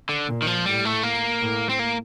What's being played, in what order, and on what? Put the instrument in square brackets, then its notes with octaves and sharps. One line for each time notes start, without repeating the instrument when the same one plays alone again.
[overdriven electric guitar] D3
[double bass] A#2
[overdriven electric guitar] D#3
F3
[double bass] A2 [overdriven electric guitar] G3
[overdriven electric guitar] A3
A#3
[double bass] A2
[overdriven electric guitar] C4
A#3